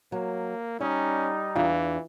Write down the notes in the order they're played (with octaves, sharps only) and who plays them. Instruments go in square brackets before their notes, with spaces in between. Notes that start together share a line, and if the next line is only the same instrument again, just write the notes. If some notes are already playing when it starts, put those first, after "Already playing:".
[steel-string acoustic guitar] F#3 [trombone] A#3
[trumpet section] G3 D#4 [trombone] C#4 [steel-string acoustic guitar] D5
[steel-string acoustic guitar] E2 D4 F4 [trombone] E3